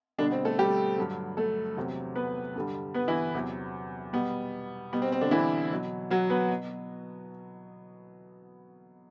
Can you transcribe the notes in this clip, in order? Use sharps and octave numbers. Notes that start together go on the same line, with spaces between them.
B2 D3 G3 D4
C4
A3 A4
G3 G4
G2 D3 F#3
A3 A4
E2 C3 F#3
B3 B4
G2 D3 G3
B3 B4
E3 E4
E2 C3 F#3
B2 G3 B3
B2 G3 B3
C4
C4
D3 D4
E3 E4
B2 F#3
F#3 F#4
B3 B4
B2